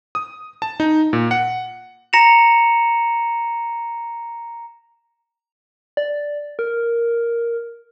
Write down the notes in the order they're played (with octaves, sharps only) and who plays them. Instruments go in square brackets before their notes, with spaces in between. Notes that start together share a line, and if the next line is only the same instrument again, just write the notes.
[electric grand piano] D#6
A5
D#4
A#2
F#5
[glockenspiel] A#5 A#6 C#7 E7 F7
[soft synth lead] D5
A#4